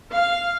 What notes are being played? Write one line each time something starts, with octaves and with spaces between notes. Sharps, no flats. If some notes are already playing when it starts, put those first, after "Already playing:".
F5